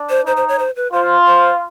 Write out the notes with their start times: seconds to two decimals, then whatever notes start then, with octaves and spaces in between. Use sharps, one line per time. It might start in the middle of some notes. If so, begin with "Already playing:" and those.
Already playing: D4
0.10 C5
0.26 D#4 C5
0.37 C5
0.49 C#5
0.59 C5
0.76 B4
0.93 F4 C5
1.27 C5